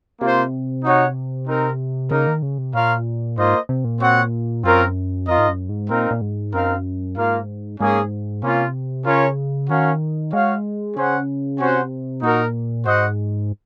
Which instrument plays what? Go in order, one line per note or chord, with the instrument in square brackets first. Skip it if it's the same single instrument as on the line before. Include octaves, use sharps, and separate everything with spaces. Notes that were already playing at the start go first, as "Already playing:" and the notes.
[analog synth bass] C3 [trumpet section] A#3 F4 C5
[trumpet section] D#4 F#4 C#5 F#5
C4 D#4 A#4
[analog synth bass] C#3 [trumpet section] A#3 D#4 A#4
[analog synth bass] D#3
C#3
C3
[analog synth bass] A#2 [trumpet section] F4 A#4 C#5 F5
[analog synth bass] G#2 [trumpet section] A#3 F4 C5 D#5
[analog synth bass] C3
A#2
[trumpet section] C4 F#4 C#5 F#5
[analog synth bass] F#2 [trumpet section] C4 F4 A#4 C#5
[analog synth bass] F2 [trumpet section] F4 A#4 D#5
[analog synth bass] G#2
F#2
G#2
[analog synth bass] A#2 [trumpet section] C4 D#4 A#4 F5
[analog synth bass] A#2
G#2
[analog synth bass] F#2 [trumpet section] C4 D#4 A#4 F5
[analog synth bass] G#2 [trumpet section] A#3 F4 A#4 F5
[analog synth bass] G#2 [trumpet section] A#3 C#4 G#4
[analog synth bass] C3 [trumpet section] A#3 C#4 F4
[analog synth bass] C#3 [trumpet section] C#4 F4 A#4 C#5
[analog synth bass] D#3 [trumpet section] C#4 F#4 A#4 F5
[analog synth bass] G#3 [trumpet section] F#4 C#5 F5
[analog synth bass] C#3 [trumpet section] C#4 G#4 C5 F#5
[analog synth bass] C3 [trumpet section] C#4 F#4 C5 F#5
[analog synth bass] A#2 [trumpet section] D#4 F#4 A#4
[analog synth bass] G#2 [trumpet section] F#4 C5 D#5 F#5